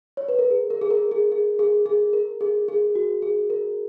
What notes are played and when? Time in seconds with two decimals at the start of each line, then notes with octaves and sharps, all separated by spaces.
0.17 C#5
0.28 B4
0.39 A#4
0.51 G#4
0.70 A#4
0.81 G#4
0.90 A#4
1.11 G#4
1.32 G#4
1.59 G#4
1.86 G#4
2.13 A#4
2.41 G#4
2.68 G#4
2.95 F#4
3.22 G#4
3.50 A#4